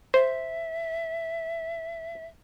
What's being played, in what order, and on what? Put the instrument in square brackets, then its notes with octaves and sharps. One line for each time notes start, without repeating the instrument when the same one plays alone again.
[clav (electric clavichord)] C5 [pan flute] E5